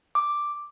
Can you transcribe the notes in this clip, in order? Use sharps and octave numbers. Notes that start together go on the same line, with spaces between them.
D6